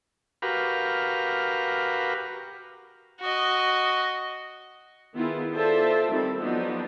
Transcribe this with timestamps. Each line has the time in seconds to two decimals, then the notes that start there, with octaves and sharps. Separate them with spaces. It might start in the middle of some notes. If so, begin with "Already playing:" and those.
0.42 F#4 G4 A#4 B4 F5
3.21 F#4 D#5
5.16 D#3 B3 E4 F4 G#4
5.55 F4 A4 C5 D5 E5 A5
6.10 D#3 G3 C4 A4
6.41 F3 F#3 B3 D4 D#4 G4